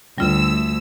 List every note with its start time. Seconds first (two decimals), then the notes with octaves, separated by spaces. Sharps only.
0.18 D2 G3 F4 E6